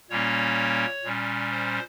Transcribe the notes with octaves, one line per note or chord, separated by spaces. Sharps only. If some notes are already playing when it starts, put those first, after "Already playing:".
A#2 G3 A#3 C#4 C#5
A#2 G3 C#4
C5